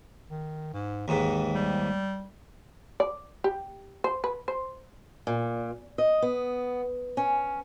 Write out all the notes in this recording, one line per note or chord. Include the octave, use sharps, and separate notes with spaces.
D#3
G#2
D#2 G#2 E3
G3
D5
G4
C5
B4
C5
A#2
D#5
B3
C#4